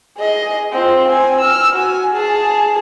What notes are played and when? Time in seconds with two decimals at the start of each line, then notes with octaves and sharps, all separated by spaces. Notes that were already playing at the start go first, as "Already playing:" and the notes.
0.18 G#4 D#5
0.72 C4 F4
1.08 C4 G#5
1.41 E6 F6
1.76 F#4 G#5
2.13 G#4 A5